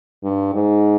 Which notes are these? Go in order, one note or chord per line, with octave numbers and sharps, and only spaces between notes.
G2
G#2